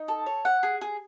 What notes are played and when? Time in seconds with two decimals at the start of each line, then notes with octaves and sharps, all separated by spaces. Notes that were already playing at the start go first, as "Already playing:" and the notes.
Already playing: D#4
0.08 A4
0.26 C#5
0.45 F#5
0.63 G#4
0.81 G#4